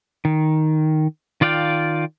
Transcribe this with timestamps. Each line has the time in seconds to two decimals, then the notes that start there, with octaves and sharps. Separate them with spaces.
0.25 D#3
1.41 D#3 F4 D5 F5 G5